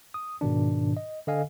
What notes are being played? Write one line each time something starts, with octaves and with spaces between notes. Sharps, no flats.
D#6
G#2 B2 D#3 D4
D#5
D3 A4 D#5 F5 G#5